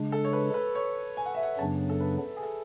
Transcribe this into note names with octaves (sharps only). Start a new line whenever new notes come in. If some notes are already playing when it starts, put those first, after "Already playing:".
Already playing: C#3 G#3 D4
A4
C#5
B4
B4
C#5
G#5
F#5
E5
F#5
F#2 C#3 F#3 B3 D4 A5
A4
B4
G#4
A4